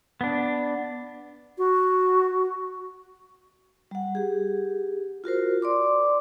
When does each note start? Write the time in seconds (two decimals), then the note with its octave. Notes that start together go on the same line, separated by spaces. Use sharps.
0.21 B3 D4
1.58 F#4
3.91 G3 F#5
4.15 G4 G#4
5.24 F4 F#4 A#4 C5
5.62 D5 C6 D6